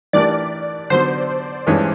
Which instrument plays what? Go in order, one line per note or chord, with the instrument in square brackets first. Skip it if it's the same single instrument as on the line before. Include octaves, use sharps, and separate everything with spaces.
[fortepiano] E3 A3 D4 G4 A#4 [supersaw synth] D5
[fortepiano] D3 F#3 B3 [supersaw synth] C5
[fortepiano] G2 E3 G#3 C#4